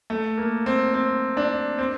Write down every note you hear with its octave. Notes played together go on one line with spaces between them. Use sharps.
A3
A#3
C4
C4
D4
C4